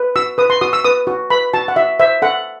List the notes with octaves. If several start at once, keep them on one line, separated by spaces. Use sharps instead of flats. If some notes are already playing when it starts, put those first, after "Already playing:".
Already playing: B4
F#4 E6
B4 D#6
C6
F#4 D#6
E6
B4 D#6
F#4
B4 B5
F#4 A5
F#5
F#4 E5
C5 E5
A4 F#5